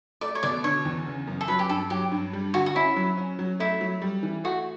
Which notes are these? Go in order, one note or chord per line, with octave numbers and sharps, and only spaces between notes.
A3 D5
C#5
B2 D5
D3 C#5
E2
C#3
F#2
A4
F#3 B4
G4
G2 A4
F#3 G4
G2
G3
D3 F#4
F#4
C#4 E4
F#3
C#4
F#3
A3 E4
F#3
G3
E3
A3 F#4